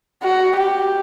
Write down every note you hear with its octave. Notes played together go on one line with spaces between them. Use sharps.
F#4
G4